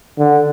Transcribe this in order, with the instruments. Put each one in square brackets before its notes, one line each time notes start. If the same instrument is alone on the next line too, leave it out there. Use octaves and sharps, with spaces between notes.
[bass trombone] D3